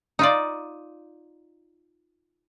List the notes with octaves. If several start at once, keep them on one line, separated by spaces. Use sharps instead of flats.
D#4 F4 D5